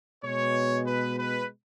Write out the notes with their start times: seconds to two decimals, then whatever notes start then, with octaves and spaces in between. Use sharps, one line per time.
0.24 B2 G#3 B3 C#5
0.87 B4
1.18 B4